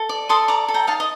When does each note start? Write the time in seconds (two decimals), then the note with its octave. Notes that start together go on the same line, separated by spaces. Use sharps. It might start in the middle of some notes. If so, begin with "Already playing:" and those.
Already playing: A4
0.09 D5
0.29 A4 C6 D#6
0.48 D5 A#5 D6
0.68 A4
0.74 G5 A#5
0.87 D#4 F5 A5
1.00 D#5